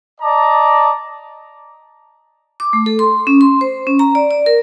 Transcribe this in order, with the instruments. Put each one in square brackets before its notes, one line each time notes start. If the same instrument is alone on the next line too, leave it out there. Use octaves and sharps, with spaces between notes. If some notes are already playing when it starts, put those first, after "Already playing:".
[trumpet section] D5 D#5 A5 A#5
[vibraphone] D6
A3
A4
C6
C#4
C6
C5
C#4
A#5
D5
D5
A#4